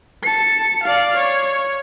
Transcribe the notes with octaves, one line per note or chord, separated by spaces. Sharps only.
A5 C#7
D5 F5
C#5